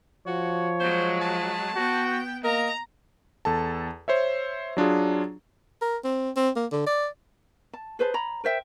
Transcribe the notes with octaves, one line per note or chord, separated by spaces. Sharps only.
F3 F#4 C#5
F#3 G#3 C5
A5
B3 F#4 G5
A#3 A#4 D#5 A#5
E2 A4 A5
C5 C#5 E5
F#3 D4 F4 G#4
A#4
C4
C4
A#3
D3
D5
A5
G#4 B4 C5 A5
C#5 A#5 B5
A#4 C5 E5 G5